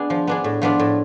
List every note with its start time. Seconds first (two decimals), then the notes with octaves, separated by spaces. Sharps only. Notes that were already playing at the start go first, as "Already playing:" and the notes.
Already playing: B3 D4 G#4
0.10 F3
0.27 B3 D4 G#4
0.44 A2
0.62 F3 B3 D4 F4
0.79 A2